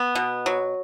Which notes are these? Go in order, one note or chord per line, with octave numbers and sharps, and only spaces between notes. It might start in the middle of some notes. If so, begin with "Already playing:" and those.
Already playing: B3
B2
F#3